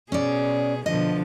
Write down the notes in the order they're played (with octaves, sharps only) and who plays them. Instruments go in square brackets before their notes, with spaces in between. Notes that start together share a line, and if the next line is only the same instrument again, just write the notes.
[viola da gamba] B2 G#4 [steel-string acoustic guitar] C#4 D5
[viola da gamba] B2 D3 F3 [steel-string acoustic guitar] D#5